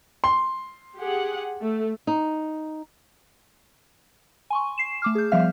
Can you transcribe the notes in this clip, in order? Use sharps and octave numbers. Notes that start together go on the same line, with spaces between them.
C6
G4 G#4 F#5
A3
D#4
G#5 C6 C#6
C7 E7
A3 D6 F6
G#4 G6
F3 G3 B3 E5 F5 F6